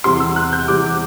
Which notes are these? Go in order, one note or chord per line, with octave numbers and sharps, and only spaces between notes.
E2 C3 G3 C6
E6
F#6
G6
E2 C3 G3 D6